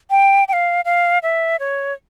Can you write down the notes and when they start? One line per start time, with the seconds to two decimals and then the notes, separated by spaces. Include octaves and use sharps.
0.10 G5
0.48 G5
0.53 F5
0.85 F5
1.23 E5
1.60 C#5